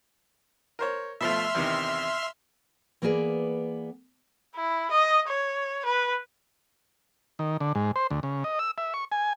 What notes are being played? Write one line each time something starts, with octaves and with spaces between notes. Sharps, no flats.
A#4 C5 C#5
B2 F3 A3 E5 C6 F6
E2 C3 D#3
E3 A#3 B3 G#4 D5
E4
D#5
C#5
B4
D#3
D3
G#2
C5
D2
C#3
D#5
E6
E5
C#6
G#5